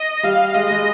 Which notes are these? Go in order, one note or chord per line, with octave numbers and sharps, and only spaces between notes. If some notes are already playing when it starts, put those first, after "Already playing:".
Already playing: D#5
G3 F5
G#3 D#5
G#3